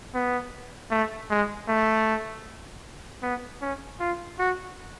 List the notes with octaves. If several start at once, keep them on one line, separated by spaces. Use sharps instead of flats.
B3
A3
G#3
A3
B3
C#4
F4
F#4